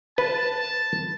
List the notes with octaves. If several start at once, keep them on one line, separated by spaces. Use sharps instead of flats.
B4 A5